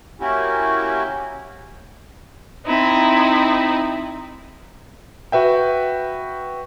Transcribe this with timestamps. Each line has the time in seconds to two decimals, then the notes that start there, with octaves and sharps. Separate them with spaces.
0.20 A#3 C#4 E4 F#4 G4
2.65 C4 D#4 E4
5.32 F#4 B4 E5 G5